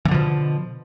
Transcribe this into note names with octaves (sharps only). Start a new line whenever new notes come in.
B2 D3 E3 F3